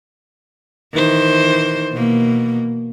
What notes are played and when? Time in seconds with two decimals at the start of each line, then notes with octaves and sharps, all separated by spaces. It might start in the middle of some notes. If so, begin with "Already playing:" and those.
0.93 D#3 E3 C5
1.92 B2 A#3